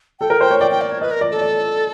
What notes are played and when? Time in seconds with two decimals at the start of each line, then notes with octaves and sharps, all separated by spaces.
0.20 A4 G5
0.30 A#4
0.41 C5 G5
0.51 C#5
0.60 D5 G5
0.71 G5
0.81 D5
0.91 C#5
1.01 B4 D#5
1.11 A#4
1.21 D5
1.31 A4
1.41 D5